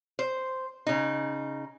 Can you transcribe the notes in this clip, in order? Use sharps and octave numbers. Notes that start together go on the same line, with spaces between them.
C5
C#3 D#4